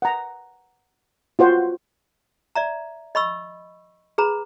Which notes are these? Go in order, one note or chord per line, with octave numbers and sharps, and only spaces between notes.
F#5 A#5
F4 F#4 C5 F#5
D5 E5 A#5
D#5 B5 C#6 E6
G#4 B4 A#5 B5